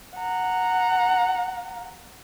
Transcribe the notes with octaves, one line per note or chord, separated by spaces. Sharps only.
F#5 A#5